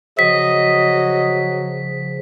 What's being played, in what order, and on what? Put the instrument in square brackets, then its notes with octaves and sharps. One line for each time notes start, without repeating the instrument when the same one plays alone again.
[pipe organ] C#3 F3 [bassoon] F#3 [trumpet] D#5 [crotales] B6